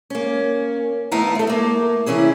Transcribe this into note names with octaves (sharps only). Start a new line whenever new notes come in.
A#3 C#4
D#2 A3 B3 E4 F5 A#5
A3 A4
A3 A#3
C3 E3 C#4 E4 G#4